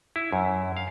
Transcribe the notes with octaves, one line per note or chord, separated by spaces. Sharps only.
E4
F#2
F5